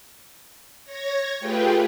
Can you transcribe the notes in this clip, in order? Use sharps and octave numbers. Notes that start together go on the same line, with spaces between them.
C#5 G#6 A#6
A3 F4 G4 G#4 B4 G5